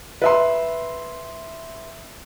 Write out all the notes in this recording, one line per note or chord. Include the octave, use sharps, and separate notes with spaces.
B4 E5 C6